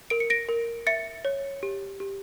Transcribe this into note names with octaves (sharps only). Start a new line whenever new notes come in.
A#4 D7
C#7
A#6 D7
A#4
E5 A6 C#7
C#5
G4
G4